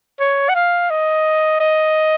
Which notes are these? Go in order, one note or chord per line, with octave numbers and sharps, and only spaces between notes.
C#5
F#5
F5
D#5
D#5